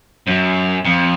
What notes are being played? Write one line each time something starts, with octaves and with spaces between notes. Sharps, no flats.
F#2
F2